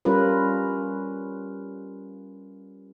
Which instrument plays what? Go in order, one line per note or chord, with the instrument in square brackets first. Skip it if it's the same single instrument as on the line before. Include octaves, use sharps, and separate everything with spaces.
[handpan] G3 C#4 F4 A#4 B4